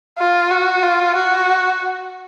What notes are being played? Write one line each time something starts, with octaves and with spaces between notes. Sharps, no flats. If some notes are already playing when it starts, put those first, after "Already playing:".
F4
F#4
F4
F#4